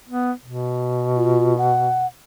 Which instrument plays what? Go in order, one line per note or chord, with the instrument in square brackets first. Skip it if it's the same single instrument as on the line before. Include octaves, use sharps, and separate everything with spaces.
[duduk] B3
B2
[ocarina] F4
F#5